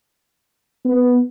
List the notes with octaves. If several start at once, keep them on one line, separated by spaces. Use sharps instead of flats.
B3